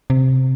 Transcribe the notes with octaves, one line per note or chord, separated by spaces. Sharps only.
C3